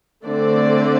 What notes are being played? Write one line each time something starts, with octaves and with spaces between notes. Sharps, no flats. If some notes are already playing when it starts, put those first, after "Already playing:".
D3 A3 C4 D5